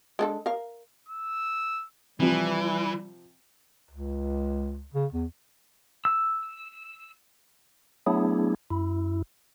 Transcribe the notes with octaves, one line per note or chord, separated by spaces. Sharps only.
G#3 D4 A4
A#4 F5
E6
C3 E3 F3 G3
C#2
C#3
E2
E6
F#3 A3 B3 D4 E4 G#4
F#2 E4